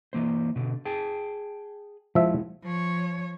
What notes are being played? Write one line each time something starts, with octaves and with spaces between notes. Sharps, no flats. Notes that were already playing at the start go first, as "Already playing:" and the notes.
E3 A#3 C5
B2 D3
G#4 G5 A5
F3 G#3 E4 E5
F3 C#5